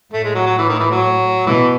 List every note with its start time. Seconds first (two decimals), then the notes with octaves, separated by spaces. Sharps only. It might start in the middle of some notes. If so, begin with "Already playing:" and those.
0.13 A2 A3
0.24 G#3
0.35 F#3
0.46 F#3
0.58 E3
0.69 D#3
0.79 E3
0.91 F#3
1.46 B2 E3